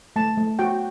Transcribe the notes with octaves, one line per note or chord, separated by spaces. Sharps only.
A3 A5
A3
F#4 G5